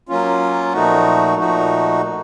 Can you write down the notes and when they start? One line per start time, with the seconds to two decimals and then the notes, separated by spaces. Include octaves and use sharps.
0.09 F#3 A#3 C#4 F4
0.73 A#2 F3 A3 D#4 F#4
1.38 A#2 F3 A3 D#4 F#4